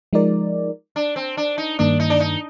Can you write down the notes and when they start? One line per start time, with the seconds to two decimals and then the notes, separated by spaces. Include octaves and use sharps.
0.13 F3 G#3 D#4 A#4 D5
0.96 D4
1.16 C4
1.37 D4
1.58 D#4
1.79 G2 D#3 A#3 D4
2.00 D#4
2.10 D4
2.20 D#4